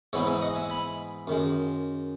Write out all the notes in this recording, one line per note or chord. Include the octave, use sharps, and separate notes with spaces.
G#2 E3 B3 D#4 C#5 E5
E5 G#5
D#5 F#5
E5 G#5
G#5 B5
F#2 D#3 G#3